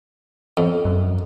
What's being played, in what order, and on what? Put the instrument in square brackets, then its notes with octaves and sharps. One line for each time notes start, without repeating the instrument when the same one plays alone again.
[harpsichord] F2
[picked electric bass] F#2